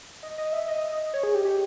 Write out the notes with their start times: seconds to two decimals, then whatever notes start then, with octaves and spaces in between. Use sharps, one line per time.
0.23 D#5
0.38 D#5
0.53 E5
0.68 D#5
1.14 C#5
1.23 G#4
1.35 G4
1.45 G4